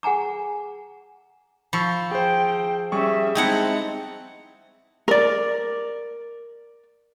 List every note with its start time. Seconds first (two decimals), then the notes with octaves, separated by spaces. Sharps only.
0.03 G#4 F#5 G#5 A#5 D6
1.73 F3 B5 C#6 E6
2.11 G#4 C5 G5
2.92 G3 C#4 G#4 E5 C#6
3.35 G#3 C4 D#4 E4 D#5 F#5 G5 A5
5.08 A#4 D5